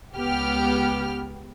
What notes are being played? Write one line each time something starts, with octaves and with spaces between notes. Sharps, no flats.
C#2 B3 G4 F6